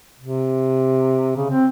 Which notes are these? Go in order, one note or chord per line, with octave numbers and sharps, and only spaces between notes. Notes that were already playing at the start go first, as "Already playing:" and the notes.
C3
C#3
C4